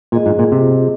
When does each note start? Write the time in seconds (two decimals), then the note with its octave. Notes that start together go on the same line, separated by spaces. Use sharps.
0.12 A#2 F4 G#4 D#5
0.26 G#2
0.39 A#2
0.52 C3